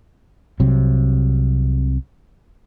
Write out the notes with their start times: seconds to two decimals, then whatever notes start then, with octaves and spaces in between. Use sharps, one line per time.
0.60 C2 C3 F#3 C4